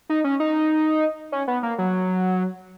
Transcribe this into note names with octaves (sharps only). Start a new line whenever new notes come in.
D#4
C#4
D#4
C#4
B3
A#3
F#3